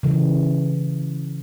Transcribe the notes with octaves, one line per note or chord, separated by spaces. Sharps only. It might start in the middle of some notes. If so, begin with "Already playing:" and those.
C#3 E3